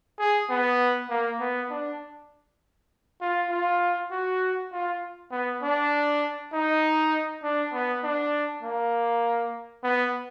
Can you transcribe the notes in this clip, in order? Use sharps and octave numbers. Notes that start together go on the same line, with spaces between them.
G#4
B3
A#3
B3
D4
F4
F4
F#4
F4
B3
D4
D#4
D4
B3
D4
A#3
B3